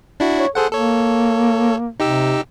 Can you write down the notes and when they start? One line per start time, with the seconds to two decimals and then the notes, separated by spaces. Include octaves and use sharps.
0.20 D4 E4 F#4
0.38 C#5
0.55 G#4 A4 C5 F#5
0.72 A#3 A4 C#5
2.00 C3 D#4 G4 E6